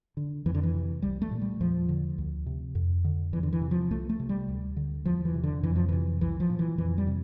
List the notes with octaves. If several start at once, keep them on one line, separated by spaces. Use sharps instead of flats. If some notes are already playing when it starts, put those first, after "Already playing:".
D3
F2 E3
D3
E3
C3
C2 G3
A3
A#2
G3
E2 F3
D3
D2
C3
F2
D3
E2 E3
D3
E3
C3
F3
C2 A3
A3
C3
G3
D2
D3
E2 F3
E3
C3
D3
F2 E3
F3
C3 E3
C2 E3
F3
A#2
E3
F2 E3
G3
C3